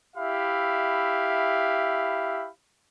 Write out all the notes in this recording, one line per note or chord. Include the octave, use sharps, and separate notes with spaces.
E4 G4 E5 F5 B5